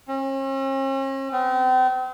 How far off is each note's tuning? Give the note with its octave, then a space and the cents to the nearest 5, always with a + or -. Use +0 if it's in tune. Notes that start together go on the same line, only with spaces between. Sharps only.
C#4 -45
C4 -40